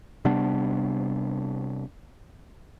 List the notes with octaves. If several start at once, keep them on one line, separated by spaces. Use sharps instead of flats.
C3 G3 B3 D4